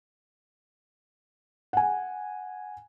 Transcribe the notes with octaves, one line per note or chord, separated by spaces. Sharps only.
F#5 G#5